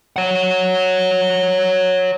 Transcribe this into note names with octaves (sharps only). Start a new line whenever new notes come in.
C#5 F#5